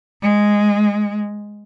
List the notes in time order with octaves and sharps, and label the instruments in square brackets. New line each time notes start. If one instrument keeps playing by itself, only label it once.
[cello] G#3